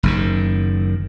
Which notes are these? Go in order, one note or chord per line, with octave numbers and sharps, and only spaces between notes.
F#1 F#2 D#3